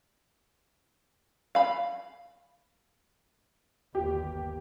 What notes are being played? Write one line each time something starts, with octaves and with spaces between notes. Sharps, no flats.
F5 B5
G1 D#2 G4